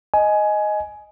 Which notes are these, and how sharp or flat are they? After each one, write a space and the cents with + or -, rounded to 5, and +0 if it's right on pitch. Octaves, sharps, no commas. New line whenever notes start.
D#5 +0 G#5 +15